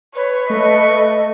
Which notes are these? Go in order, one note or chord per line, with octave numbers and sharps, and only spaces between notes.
B4 C#5
A3 D#5 C#6